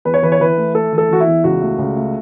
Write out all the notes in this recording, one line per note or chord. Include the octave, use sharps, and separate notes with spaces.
E2 B4
C#5
E3 B4
C#5
E3 B4
A3
A3 A4
E3
A4
E3 F#4
E4
E2
C#2 F#4
A3
C#2
A3